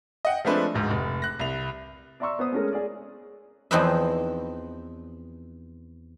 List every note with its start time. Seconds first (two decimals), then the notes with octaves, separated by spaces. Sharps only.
0.25 D#5 F#5 G5
0.45 F3 G#3 A3 C4 D4 B4
0.74 D1 G#2
0.91 F1
1.22 F#6 A#6
1.39 C2 F7
2.20 D5 E5 A#5 C6 C#6 E6
2.39 B3 C5 D#6
2.52 G#3 A3 C#4 G#4 A#4
2.73 G#4 D5
3.71 E2 F3 C4 D#4 B4 E5